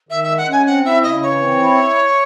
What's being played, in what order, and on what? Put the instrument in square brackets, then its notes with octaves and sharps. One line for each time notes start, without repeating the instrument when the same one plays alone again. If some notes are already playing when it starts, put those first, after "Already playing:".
[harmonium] D#3 [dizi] E5
[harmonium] G#3 [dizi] E5
[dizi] F#5
[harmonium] C#4 [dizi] G#5
[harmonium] C4 [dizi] F#5
[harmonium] E4 [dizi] E5
[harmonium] C#3 [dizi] D#5
[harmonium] E3 [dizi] C#5
[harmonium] C4
E4